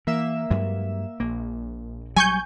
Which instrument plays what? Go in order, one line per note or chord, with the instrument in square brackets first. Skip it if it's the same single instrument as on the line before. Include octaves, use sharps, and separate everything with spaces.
[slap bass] E3 [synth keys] A#3 E5 E7
[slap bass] G2 F#3 G#3
[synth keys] A#1 [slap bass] A#3
[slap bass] F#3 G3 [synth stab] G#5 C#6 G6